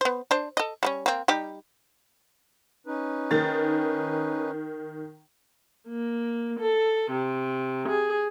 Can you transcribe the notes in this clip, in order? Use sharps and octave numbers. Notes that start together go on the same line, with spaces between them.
B3 C5
D4 C5
A4 D#5
G3 A#3 C#4
A#3 C4
G3 D#4 G4
C#4 D#4 B4
D#3 A6
A#3
A4
C3
G#4